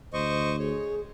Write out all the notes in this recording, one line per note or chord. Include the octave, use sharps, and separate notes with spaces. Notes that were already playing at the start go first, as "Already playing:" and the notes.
D2 C5 D#5 C#6
G#4 C#5